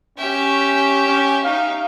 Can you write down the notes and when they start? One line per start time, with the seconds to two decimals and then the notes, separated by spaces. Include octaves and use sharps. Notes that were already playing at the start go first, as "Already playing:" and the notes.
0.18 C#4 G4 E5
1.07 C#4
1.44 D#4 F5